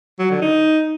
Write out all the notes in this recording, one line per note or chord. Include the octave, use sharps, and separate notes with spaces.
F#3
D3
D#4